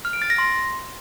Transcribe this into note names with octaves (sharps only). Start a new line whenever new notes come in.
F6
D7
A6
A#6
C6